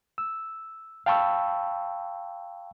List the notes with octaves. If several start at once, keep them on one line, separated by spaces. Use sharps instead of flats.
E6
F5 G5 A5 B5 C#6 E6